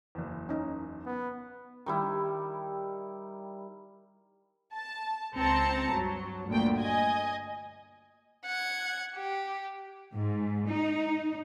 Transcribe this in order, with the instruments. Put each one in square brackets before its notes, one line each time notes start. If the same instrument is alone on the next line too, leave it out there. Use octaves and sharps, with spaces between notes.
[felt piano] F#1 E2
[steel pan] C#4 D#4
[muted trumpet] B3
[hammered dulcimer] D#3 G3 E4
[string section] A5
C#2 C4 A5 A#5 C#7
G2 F#3
G1 D2 A#2 G5
D#5 G#5
[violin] F#5 G#6
G4
[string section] G#2
D#4